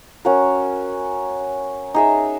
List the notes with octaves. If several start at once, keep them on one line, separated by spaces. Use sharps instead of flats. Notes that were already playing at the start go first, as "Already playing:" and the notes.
C#4 F#4 A#4
D#4 G#4 E5